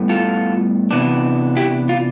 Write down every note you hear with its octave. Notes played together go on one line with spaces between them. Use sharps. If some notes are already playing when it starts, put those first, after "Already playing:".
Already playing: A2 G3 B3
F4 A4
C3 E3 B3 D4
E4 G4
F4